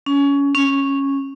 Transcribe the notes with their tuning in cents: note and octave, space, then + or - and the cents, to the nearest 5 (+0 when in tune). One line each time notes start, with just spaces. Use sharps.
C#4 +20
C#4 -10